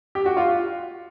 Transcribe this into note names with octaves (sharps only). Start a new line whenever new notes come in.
G4
F#4
F4